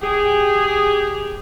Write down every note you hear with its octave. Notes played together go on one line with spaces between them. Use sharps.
G4 G#4